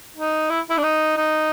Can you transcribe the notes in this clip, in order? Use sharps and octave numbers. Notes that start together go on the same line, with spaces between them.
D#4
E4
E4
D4
D#4
D#4